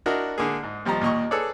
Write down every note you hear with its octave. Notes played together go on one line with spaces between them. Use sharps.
D4 E4 F#4 A#4 D#5
D3 A#3 G#4
G#2
D#2 F3 G3 D#5 A#5
D#2 A#2 D#5 C#6
G#4 A4 B4 C#5 D5